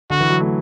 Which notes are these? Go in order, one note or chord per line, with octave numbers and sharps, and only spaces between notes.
D3 F#4
E3
F#3
A3